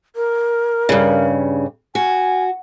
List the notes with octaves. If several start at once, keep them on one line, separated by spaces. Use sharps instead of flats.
A#4
G2 C#3
F#4 G#5